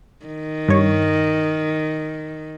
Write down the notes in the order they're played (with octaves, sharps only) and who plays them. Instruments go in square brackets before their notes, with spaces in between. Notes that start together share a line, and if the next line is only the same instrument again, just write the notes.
[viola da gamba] D#3
[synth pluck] G2 C#5